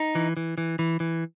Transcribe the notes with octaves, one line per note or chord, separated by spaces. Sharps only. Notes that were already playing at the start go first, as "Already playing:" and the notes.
Already playing: D#4
E3
E3
E3
E3
E3